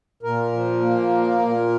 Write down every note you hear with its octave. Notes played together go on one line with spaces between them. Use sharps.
A#2 A#4
F3
A#3
A#2
A#2